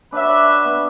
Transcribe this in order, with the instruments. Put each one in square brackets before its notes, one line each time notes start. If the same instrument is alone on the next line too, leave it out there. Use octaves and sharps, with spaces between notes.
[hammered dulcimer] D4 [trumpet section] F#4 B4 E5
[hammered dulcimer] B3